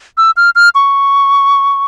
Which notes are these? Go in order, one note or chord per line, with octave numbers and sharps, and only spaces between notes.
E6
F6
F6
C#6